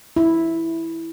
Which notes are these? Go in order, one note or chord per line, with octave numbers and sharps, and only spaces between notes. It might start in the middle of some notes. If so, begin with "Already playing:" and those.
E4